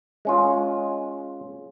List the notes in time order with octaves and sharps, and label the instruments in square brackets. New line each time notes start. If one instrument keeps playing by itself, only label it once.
[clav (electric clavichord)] G#3 C#4 F4